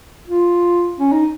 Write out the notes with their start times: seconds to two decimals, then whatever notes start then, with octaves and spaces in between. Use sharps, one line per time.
0.27 F4
0.99 C#4
1.12 D#4